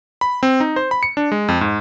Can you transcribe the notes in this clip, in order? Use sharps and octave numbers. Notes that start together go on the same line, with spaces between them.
B5
C4
D#4
C5
B5
C#7
D4
G#3
F2
G#2